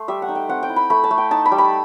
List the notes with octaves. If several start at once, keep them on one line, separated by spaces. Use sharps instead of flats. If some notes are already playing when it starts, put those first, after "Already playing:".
Already playing: A3 C6
G3 E5
F#5
D#4
G5
C4 F#5
G5
E4
B5
A3 B5
A5
A3
G5
D#4 A5
B5
G3
B5